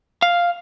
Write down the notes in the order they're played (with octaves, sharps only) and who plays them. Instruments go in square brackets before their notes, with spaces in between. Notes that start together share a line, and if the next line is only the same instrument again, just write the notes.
[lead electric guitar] F5